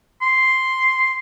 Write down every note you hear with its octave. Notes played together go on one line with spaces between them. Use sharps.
C6